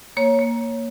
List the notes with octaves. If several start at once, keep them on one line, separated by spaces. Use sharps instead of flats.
A#3 C#5
A#3